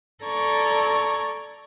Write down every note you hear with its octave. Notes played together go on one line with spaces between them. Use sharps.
A4 D5 A#5 C#6 G#6